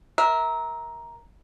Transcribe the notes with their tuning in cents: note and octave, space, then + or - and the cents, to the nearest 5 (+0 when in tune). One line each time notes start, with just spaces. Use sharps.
A#4 +5 E5 -25